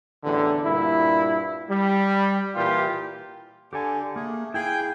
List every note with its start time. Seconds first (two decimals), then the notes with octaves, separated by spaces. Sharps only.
0.24 A1 E2 D3
0.65 G2 A#2 E4
1.70 G3
2.55 A#2 E3 F4 G4
3.73 D3 G4 A4 G#5
4.16 A3 A#3 G#4
4.54 E4 G#4 F5 G5 G#5 G6